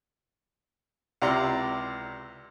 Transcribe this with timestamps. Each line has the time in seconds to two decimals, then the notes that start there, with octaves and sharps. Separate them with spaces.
1.22 C#2 C3 E4 D5 A#5 C6